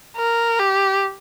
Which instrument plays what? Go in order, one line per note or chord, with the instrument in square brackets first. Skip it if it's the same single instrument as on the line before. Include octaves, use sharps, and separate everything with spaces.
[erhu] A#4
G4